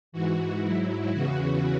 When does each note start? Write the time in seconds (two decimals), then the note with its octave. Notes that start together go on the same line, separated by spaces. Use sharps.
0.12 G#2 E3 F#4
0.62 G#2 F#3 E4
1.11 E2 C#3 E3 F#4